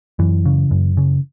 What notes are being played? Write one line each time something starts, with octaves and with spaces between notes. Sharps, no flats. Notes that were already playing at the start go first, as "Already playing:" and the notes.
F#2 E3
C#3
F#2
C#3